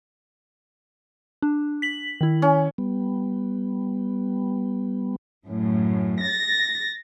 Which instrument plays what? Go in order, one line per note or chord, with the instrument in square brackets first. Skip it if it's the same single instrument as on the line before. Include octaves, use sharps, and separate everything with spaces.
[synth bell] D4
B6 F#7
D#3 E4
[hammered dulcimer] C#4
[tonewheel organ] G3 B3
[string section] F#2 A2
A6 A#6